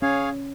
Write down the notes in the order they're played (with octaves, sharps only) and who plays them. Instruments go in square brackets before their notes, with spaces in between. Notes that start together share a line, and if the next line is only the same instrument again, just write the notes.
[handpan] C#4 [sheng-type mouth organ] G#4 C#5 F5 G#5